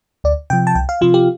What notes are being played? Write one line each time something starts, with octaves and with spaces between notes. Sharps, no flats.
D2 D5
C3 F3 G5
A5
C2 G5
F5
C3 F3 F4
G4